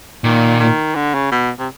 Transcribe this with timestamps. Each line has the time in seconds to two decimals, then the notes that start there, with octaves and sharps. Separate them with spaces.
0.24 A#2 D#3
0.60 D#3
0.95 D3
1.14 C#3
1.31 B2
1.59 C3